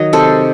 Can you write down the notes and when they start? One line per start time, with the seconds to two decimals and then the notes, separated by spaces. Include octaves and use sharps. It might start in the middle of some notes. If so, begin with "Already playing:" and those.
Already playing: D#3 F#3 D#5
0.13 C3 A4 C5